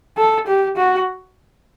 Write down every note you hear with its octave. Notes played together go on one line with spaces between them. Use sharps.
A4
G4
F#4